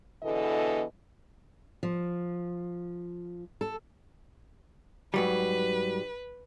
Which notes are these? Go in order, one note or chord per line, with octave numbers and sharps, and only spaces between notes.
E2 B2 D3 E3 A4 D#5
F3
A4
G#2 F#3 G3 B4